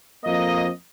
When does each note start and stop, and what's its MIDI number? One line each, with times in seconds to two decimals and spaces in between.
0.24 0.67 41
0.24 0.67 58
0.24 0.67 75